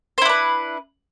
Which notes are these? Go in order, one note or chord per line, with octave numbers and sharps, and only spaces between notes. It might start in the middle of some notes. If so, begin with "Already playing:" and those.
D4 E4 B4 C5